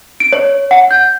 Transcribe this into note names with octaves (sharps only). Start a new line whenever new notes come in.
D7
C#5
F#5
G6